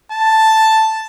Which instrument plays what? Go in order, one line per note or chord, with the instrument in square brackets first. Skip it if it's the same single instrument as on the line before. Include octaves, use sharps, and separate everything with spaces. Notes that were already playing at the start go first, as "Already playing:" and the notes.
[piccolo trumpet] A5